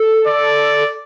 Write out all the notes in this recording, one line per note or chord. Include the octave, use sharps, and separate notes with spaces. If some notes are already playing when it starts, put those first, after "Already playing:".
Already playing: A4
D5